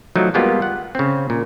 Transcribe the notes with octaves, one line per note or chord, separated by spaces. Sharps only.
F3 F#3 A3 D#4
G3 G#3 A#3 B3 F4 G4
F#5
C#3 C4
A#2